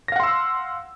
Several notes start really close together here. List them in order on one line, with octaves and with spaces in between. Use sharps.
A#6 F5 F#5 C6 E6